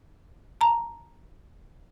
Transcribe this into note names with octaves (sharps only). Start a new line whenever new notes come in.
A5 A#5